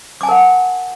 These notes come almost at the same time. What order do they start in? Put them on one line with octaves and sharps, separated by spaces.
D6 G#5 A5 A#4 F#5